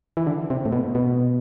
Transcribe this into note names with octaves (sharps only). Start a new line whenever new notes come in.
E3
D3
C3
A2
B2
B2